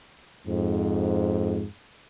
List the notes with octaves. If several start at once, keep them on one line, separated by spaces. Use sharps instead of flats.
F2 G#2